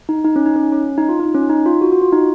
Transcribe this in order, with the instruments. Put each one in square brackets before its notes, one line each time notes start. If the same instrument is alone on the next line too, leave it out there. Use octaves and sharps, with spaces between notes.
[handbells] D#4
D#4
C#4
D#4
C#4
C#4
D#4
F4
D#4
C#4
D#4
F4
F#4
F#4
F4
D#4